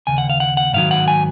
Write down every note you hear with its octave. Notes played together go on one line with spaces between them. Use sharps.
D#2 C#3 G#5
F#5
F5
F#5
F#5
G#2 D#3 F#3 F5
F#5
G#5